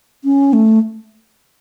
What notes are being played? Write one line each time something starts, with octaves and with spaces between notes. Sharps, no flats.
C#4
A3